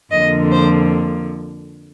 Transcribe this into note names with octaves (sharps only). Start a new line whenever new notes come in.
F2 D3 F3 A#3 D#5
C5